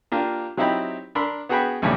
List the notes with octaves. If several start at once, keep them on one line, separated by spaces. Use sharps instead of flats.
A#3 D4 F4 G4
F#3 C4 D#4 E4 G4 B5
D4 A#4 B5 C6 E6
B3 F#4 G#4 F#5 G5 B5
B1 E2 A2 C#3 G3